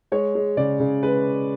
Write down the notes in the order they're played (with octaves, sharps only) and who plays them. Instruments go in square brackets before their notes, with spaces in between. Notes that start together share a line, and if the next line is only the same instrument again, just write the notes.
[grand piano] G#3 C#5
G#3
C#3 D5
C#3
G#3 B4